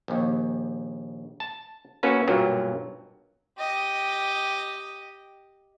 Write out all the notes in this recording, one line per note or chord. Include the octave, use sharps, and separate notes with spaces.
A#1 D#2
A5
A#3 B3 C#4 F#4 A4 B4
B1 G2 A#2 F#3 A#3
G4 D#5